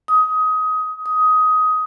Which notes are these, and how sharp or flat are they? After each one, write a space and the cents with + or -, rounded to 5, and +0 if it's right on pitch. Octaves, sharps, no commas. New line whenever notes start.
D#6 +20
D#6 +15